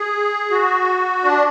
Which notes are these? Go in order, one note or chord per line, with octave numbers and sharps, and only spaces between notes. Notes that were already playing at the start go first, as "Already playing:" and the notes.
Already playing: G#4
F#4
D4